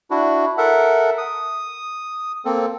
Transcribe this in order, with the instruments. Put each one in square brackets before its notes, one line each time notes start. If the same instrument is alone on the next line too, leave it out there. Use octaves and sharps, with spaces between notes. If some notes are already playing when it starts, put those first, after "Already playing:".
[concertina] D4 E4 F#4
A4 A#4 E5 F#5
D#6
A#3 C4 A4